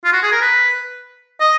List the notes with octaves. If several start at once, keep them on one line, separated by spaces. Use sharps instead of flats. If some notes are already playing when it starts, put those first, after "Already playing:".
F4
F#4
G#4
A#4
B4
D#5